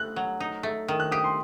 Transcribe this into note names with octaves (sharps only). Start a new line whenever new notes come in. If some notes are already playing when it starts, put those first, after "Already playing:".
Already playing: A3 F#6
F#3
D#4
A3
D#3
F#6
G4 D#6
C6